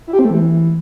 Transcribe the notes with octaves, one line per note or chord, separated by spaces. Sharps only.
E4
G4
C4
A3
E3